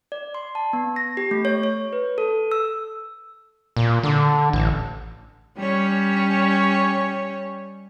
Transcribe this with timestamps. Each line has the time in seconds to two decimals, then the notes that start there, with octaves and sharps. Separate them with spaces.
0.12 D5
0.34 C6
0.55 A5
0.73 B3
0.96 A#6
1.17 G4
1.31 A3
1.45 C#5
1.63 C#5
1.93 B4
2.18 A4
2.52 E6
3.77 A#2
4.03 D3
4.53 A1
5.58 G3 C#4 C#5